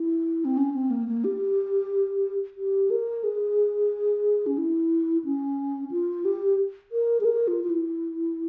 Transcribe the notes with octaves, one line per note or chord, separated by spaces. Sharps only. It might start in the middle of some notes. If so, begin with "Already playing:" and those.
Already playing: E4
C4
C#4
C4
A#3
A#3
G4
G4
A#4
G#4
C#4
E4
C#4
F4
G4
A#4
G#4
A#4
F4
F4
E4